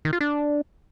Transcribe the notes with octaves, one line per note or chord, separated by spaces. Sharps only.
D#3
F4
D4